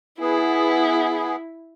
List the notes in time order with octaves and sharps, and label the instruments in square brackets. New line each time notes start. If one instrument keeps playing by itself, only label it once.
[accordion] B3 G#4 [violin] E4